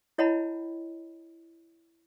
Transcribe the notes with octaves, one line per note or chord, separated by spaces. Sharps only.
E4 C#5 D#5 F#5 A5 B5